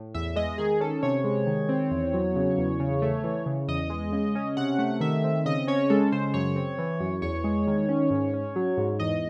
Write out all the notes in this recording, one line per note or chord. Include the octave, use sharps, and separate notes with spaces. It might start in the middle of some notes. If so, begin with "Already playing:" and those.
Already playing: A2
E2 E5
G#3 D#5
D#3 G#4
C#4 A4
C3 C#5
G#3
D#3
C4
E2
F#3
C#3
E2
C#3
A3
E3
C#3
E2 D#5
G#3
C#3
C#4
C3 F#5
A3
D#3 E5
C4
C#3 D#5
C#4 C#5
G#3 A4
C#3 C5
F#2 C#5
C4
E3
F#2
E2 C#5
G#3
D#3
C#4
G#2
C#4
F#3
G#2
E2 D#5